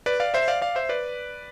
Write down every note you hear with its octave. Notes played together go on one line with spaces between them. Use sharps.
B4 D5
D5 F5
C5 E5
D5 F5
D5 F5
C5 E5
B4 D5